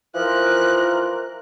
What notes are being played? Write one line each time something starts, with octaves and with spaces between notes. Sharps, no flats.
E3 F3 F4 A#4 F#6